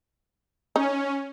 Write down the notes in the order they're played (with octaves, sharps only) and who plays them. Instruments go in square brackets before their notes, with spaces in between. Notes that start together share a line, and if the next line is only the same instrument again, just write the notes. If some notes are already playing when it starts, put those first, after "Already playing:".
[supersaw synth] C#4 [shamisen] D#4